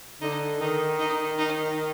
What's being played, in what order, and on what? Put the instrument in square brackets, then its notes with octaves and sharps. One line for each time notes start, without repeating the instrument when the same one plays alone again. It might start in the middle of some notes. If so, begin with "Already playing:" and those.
[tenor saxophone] D3 [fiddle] D#4
[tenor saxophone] D#3 [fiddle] D#4
[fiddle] D#4
D#4